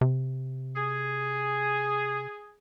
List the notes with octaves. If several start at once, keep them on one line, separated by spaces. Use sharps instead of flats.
C3
G#4